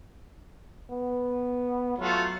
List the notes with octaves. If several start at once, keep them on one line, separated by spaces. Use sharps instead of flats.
B3
F#3 A3 F4 F#4